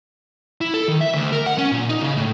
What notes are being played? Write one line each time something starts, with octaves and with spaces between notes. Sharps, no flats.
E4
A4
D#3
E5
D2
A#4
F#5
C#4
A#2
D#4
C#3
A2